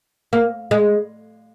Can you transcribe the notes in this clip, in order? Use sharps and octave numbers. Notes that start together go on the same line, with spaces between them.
A#3
G#3